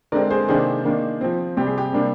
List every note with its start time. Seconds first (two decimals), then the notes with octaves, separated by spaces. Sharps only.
0.12 D3 G#3 C4 A#4 D5
0.30 G#4 C5
0.48 C3 D#3 A#3 D4 G#4 C5
0.85 D#3 A#3 D4
1.21 F3 C4
1.57 C3 G3 C4 G4
1.67 G#4
1.78 G4
1.93 C3 G3 A#3 D4